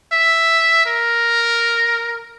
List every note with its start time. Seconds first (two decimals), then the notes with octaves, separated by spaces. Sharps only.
0.12 E5
0.86 A#4